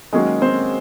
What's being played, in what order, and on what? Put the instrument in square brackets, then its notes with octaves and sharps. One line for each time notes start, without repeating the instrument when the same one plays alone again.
[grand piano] D#3 F#3 A#3 C#4 F#4 [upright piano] G#3 G#4
[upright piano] C4 C5